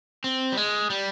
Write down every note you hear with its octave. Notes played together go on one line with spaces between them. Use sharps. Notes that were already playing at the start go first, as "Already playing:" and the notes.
C4
G3
G#3
G3